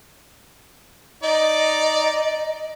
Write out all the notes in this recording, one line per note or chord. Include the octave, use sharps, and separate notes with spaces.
D#4 D5 D#5